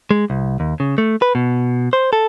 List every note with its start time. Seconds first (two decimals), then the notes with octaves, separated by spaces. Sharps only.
0.11 G#3
0.30 C2
0.60 D#2
0.80 C#3
0.98 A3
1.22 B4
1.35 B2
1.93 C5
2.13 A4